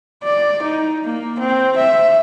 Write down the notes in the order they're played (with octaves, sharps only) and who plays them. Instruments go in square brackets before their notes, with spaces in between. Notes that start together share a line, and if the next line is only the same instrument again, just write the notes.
[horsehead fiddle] D5
D#4
A#3
C4
E5